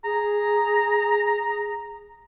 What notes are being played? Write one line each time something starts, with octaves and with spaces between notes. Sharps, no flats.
G#4 A#5